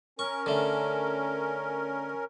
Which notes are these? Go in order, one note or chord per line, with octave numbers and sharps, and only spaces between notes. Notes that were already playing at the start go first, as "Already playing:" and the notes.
C#4 A#4 C#6
D3 A3